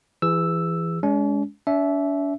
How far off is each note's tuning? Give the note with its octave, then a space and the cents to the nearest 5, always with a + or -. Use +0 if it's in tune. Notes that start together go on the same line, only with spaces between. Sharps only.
E3 +20 G#4 -30 E6 +0
G#3 +0 C#4 +45
D4 -45 E5 +0